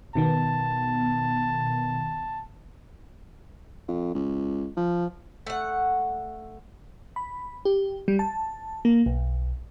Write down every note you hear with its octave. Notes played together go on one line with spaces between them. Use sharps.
B2 D#3 B3 A5
F2
C#2
F3
A3 F#5
B5
G4
G3
A5
A#3
B1